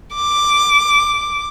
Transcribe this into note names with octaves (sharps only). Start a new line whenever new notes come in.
D6